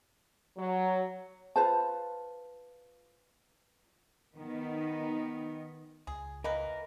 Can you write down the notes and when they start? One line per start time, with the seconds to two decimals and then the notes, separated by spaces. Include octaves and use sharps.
0.57 F#3
1.56 F4 B4 C5 A5
4.37 D#3 B3 D#4
6.07 C#2 G#4
6.44 E3 A#3 A#4 B4 D#5